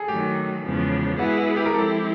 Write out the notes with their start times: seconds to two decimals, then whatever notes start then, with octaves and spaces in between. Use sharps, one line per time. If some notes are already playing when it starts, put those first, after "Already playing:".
Already playing: G#4 A4
0.08 D#3 F#3 A3 G4
0.63 E2 C#3 F3 G#3 B3
1.18 G#3 B3 E4 F#4 G#4 B4
1.37 F#4
1.56 G4
1.65 A#4
1.74 F3 G#3 C4 E4 G4 A4